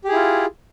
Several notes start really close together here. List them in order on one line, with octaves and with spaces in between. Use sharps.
G4 G#4 E4 F4